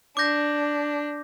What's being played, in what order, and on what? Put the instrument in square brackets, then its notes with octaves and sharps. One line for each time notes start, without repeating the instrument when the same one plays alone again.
[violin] D4 [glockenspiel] D6 G6 A#6